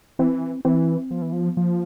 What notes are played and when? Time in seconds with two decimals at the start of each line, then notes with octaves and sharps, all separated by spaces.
0.19 E3 C4
0.65 E3 C4
1.11 F3 B3
1.22 E3
1.32 F3
1.56 F3 A#3